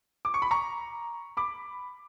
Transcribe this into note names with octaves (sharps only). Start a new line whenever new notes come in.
D6
C#6
B5
A#5 C#6
B5 D6